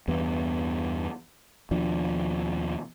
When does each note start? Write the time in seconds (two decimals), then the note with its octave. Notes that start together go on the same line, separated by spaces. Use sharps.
0.08 E2 G2 B3
1.71 D#2 B2 F3 D4